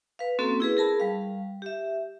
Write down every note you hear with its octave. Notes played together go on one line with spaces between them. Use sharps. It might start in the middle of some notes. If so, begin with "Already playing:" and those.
B4 F5
A#3 C4 C#4 F#4 A4
E4 G#4 B4
G#4 A#4 A5 B5
G3 F5
G4 E5